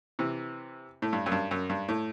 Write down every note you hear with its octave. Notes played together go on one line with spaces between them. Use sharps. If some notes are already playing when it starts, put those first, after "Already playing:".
C3 E3
A2
G2
F#2
G2
F#2
G2
A2